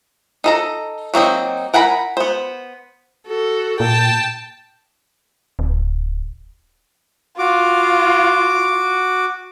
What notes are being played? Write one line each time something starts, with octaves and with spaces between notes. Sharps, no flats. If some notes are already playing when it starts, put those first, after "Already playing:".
D#4 A4 A#5
F#3 A#3 C4 D#4
A#4 F#5 G#5 A#5 B5
B3 C5
F#4 A4
A#2 G5 A5
D1
F4 F#4 D6